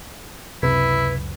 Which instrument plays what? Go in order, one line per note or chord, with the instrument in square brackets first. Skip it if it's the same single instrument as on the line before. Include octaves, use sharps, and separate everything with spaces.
[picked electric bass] C#2 F#2 [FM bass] C3 [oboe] E4 [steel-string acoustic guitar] B4